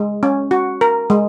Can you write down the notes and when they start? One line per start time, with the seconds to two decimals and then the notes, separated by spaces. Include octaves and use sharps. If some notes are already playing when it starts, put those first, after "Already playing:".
Already playing: G#3
0.23 C#4
0.51 F#4
0.81 A#4
1.10 G#3